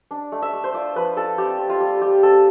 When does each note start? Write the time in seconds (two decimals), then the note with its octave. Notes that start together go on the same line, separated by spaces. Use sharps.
0.11 D4
0.32 A3
0.42 E5
0.53 A3
0.64 C5
0.74 F4 D5
0.96 F3 B4
1.17 F4 A4
1.37 C4 G4
1.59 C4
1.69 F4
1.80 G3
2.01 F4 G4
2.23 C4 A4